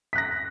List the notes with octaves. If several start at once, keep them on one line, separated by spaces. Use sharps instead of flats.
F#6 A#6 B6